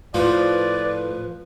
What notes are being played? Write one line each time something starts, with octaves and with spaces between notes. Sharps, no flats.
A2 F3 B4 D5